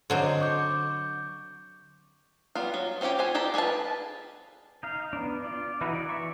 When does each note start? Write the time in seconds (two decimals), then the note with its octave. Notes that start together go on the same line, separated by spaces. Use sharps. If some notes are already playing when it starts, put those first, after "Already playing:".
0.10 D3 F#3 C4 D#5 C6
0.41 C#6 D6 G6
2.55 G3 B3 F4
2.74 F#3
3.01 C4 C#4 F4 G4 C#5
3.19 F4 C5 F#5 G#5
3.35 F4 G4 A4 D5 A#5
3.54 B3 G#4 B4 F5 A5
4.83 D#4 F5
5.13 B3 D4
5.44 F4 D5
5.81 E3 B3 D#4 E4 F#4
5.94 D5
6.09 E3 E5 C#6